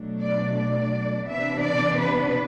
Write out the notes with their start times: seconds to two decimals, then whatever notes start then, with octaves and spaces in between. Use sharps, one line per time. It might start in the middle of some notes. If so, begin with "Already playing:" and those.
Already playing: B2 F#3 A3 D4
0.20 D5
0.57 D5
1.27 C3 E3 B3 D4 E5
1.64 D5
1.99 B4